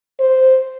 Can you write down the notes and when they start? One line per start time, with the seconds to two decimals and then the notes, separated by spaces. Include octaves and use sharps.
0.20 C5